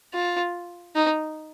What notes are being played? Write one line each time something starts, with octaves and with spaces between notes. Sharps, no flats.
F4
D#4